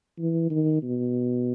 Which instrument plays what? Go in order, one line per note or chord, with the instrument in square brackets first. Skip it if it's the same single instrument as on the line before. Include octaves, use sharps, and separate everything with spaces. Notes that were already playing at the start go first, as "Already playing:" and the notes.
[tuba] E3
D#3
B2